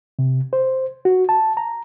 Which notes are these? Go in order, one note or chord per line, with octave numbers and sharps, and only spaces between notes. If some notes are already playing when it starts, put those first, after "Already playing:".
C3
C5
F#4
A5
A#5